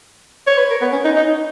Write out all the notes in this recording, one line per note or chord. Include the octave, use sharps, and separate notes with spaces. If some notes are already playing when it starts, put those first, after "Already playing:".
C#5
B4
A#4
B3
C#4
D#4
D#4